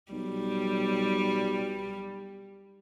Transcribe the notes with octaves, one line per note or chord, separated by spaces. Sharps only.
B1 G3